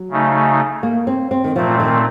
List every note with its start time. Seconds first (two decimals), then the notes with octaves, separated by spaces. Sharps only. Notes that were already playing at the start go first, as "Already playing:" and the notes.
Already playing: F#3
0.10 C#3 A3 D#4
0.83 A#3
1.07 C4
1.31 C4
1.44 D#3
1.55 A#2 F3 A3 C4
1.80 D#3